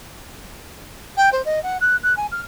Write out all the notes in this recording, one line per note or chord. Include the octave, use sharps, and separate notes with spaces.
G5
C5
D#5
F#5
F#6
F#6
G#5
F6